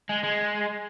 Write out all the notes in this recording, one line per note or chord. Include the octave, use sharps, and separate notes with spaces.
G#3
G#3